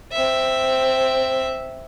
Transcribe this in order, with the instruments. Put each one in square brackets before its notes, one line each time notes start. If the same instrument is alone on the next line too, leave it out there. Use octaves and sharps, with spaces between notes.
[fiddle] C4 E5